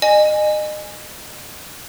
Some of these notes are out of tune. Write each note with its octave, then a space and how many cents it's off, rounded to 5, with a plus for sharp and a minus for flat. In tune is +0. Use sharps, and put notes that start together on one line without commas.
D#5 -35 G#5 +0